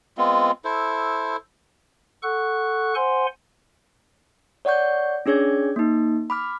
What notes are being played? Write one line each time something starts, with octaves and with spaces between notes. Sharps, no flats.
G#3 B3 C4 F4
E4 A4 C5
A4 F#5 C#6 F#6
C5 F#5 G#5 C6
C#5 D5 F#5 C#6 G6
C#4 D4 G#4 C#5 G#6
A#3 D#4
B5 D6 F6